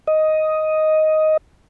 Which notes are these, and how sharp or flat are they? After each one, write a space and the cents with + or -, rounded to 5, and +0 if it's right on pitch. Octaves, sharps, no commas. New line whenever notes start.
D#5 +5